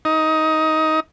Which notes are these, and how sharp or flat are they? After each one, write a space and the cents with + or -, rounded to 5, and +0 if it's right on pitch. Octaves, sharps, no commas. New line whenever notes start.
D#4 +15